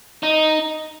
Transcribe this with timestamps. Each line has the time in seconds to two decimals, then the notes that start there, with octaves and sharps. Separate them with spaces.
0.23 D#4